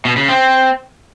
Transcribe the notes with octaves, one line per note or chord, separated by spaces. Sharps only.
B2
C#3
C4